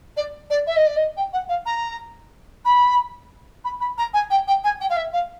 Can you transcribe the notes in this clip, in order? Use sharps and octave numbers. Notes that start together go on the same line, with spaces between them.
D5
D5
E5
D#5
D5
D#5
G5
F#5
F5
A#5
B5
B5
B5
A#5
G#5
G5
G5
G#5
G5
F5
E5
F5